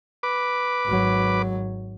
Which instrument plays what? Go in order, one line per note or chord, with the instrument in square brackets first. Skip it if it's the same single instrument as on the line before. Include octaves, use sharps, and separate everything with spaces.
[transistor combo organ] B4 D6
[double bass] G#1 F#3